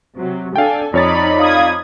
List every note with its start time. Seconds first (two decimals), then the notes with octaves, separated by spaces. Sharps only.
0.16 C3 F#3
0.56 D4 A4 F5 G5 G#5
0.94 F2 D#4 C#5 D5 B5 A6
1.39 F5 D#6 G#6